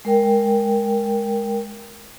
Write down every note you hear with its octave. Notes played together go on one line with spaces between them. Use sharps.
G#3 A#4 G5